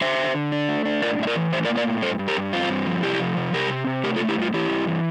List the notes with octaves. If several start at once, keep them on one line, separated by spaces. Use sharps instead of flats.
D3 C5 E5
D3
D3
D4
A3
D4
A2 A#4 D5
A2 E5
A#4 D5
E3
A2 C5 E5
A#4 D5
A#3
A#4 D5
A2
G2 A4 C5
G2
G4 A#4
G2
C4 F4
G2
F3
C3 E4 G4
F3
C3
C3 G4 A#4
C4
C3
A3 G4 A#4
F4 A4
A3
E4 G4
G2 F4
E3 E4 G4
G2
E3